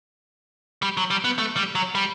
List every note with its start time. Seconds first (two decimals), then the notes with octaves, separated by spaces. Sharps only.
0.82 G3
0.97 F#3
1.10 G3
1.24 B3
1.38 A3
1.57 G3
1.75 F#3
1.95 G3